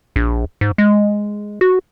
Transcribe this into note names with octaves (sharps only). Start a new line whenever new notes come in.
A#1
G#2
G#3
F#4